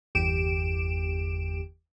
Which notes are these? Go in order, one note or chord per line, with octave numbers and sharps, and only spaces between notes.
G1 E2 G4 D7 E7